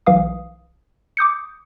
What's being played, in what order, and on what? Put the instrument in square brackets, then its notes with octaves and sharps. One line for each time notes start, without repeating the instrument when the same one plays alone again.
[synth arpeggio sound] B1 E3 F5 D#6
D6 D#6 G6 C#7